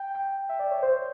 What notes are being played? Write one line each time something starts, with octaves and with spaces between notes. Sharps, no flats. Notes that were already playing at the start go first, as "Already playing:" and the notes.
Already playing: G5
G5
E5
D5
C#5
C5